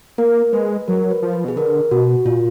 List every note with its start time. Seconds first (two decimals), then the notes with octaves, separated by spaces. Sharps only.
0.18 A#3 A#4
0.53 G#3 B4
0.88 F#3 A#4
1.11 B4
1.22 F3
1.33 B4
1.45 B2 G#4
1.57 D3 A#4
1.91 B2 F#4
2.25 A#2 F4